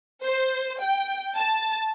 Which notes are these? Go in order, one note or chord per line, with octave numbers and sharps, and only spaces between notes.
C5
G5
A5